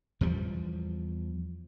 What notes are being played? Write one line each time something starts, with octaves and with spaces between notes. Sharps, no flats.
E2 F3 G3